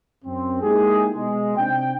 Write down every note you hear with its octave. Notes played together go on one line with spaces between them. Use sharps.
F#2 C4
G#3 A#3 D#4 E4 G4 G#4
B2 G#3
C3 C4 D4 D#4 G5